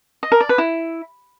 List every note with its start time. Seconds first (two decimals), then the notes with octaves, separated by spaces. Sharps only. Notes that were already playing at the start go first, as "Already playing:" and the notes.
0.23 D#5
0.32 A#4
0.41 D5
0.49 B4
0.58 E4